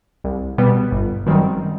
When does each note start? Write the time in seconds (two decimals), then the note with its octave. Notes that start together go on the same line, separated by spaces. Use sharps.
0.24 C2
0.58 B2 G3 B3
0.92 G1
1.26 F#2 D#3 G3 C4